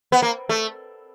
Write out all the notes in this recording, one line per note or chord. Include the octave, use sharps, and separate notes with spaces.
B3
A#3
A3